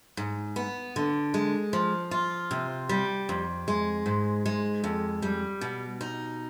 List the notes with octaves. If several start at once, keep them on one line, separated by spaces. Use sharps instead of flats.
G#2
B3
D3
G#3
F3
F4
C3
G3
F2
G#3
G#2
G#3
F2
G3
B2
D#4